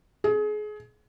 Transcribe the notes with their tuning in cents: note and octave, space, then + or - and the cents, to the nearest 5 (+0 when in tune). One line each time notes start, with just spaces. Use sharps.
G#4 +30